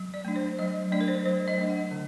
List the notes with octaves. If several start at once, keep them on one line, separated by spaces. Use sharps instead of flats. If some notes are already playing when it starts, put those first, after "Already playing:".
Already playing: F#3
D5
A3 D4
C5
F#3 D#5
A3 D4 D5
A#4
C5
F#3 C5
D#5
A3 D4
F#5
D3